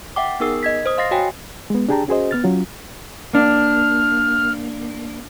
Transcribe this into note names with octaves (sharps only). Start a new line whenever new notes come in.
E5 F#5 G5 D6
B3 D#4 G#4 A#4 E6 C7
D#5 G#6 B6
C5 D#6
D#5 F5 C6 A6 A#6 C7
F#4 C#5 G5 G#5
G#3 B3
D4 G4 G#4 G5 A5 A#5
C#4 F#4 G#4 C5 D#5
B3 F6 A6
F#3 C#4 F4
A#3 D4 F6